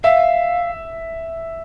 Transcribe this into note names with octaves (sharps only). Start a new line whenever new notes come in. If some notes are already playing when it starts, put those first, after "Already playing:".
E5 F5